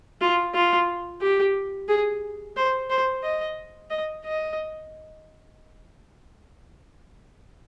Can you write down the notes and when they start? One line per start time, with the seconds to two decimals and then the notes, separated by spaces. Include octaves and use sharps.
0.21 F4
0.55 F4
1.22 G4
1.89 G#4
2.56 C5
2.90 C5
3.23 D#5
3.90 D#5
4.25 D#5